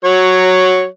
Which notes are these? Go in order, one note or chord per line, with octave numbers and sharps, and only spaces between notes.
F#3 C#5